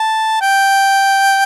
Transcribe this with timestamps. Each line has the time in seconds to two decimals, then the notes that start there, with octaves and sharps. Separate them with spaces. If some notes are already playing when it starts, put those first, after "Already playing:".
Already playing: A5
0.42 G5